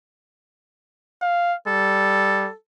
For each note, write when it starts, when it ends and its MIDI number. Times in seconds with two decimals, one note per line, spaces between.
1.21 1.55 77
1.67 2.49 55
1.67 2.54 69